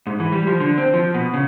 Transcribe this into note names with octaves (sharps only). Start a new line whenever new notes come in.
G#2
E3
G3
F3
D3
C4
F3
B2
C#3